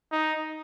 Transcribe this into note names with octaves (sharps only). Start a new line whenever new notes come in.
D#4